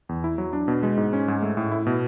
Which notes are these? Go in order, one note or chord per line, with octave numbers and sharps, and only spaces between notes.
E2
E4
F#3
D4
B2
G#3
G#2
C#4
G#2
A3
A2
E4
B2